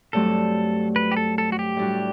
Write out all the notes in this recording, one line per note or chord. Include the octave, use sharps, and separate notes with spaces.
G2 F#3 A3 C4 A4
B4
G4
A4
A4
F#4
G4
A2 G3 D4 F#4